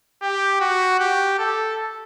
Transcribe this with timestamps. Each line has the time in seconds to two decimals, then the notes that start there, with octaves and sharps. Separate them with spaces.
0.22 G4
0.60 F#4
1.00 G4
1.39 A4